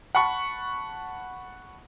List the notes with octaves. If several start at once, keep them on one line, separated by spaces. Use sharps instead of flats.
F#5 A5 B5 C#6